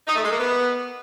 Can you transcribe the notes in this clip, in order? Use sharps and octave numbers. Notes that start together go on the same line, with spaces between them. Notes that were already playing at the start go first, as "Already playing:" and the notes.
D#4
A3
G#3
A#3
B3